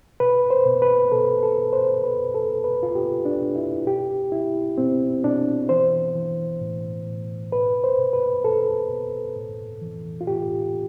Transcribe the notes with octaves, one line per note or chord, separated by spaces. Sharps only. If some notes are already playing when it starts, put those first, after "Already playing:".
B2 B4
C5
B2
B4
B2 A4
A4
B2
C5
B2 B4
A4
B2
B4
F4
B2 G4
D4
B2
E4
B2 G4
B2 E4
B2 C4
B2 D4
E3 C5
E3
A2
A2
B2 B4
C5
B2
B4
B2 A4
B2
A2
E3
F4
A2 G4